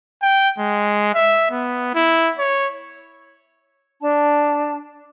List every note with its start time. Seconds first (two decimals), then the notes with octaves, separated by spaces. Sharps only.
0.22 G5
0.59 G#3
1.15 E5
1.51 B3
1.95 E4
2.39 C#5
4.01 D4 A5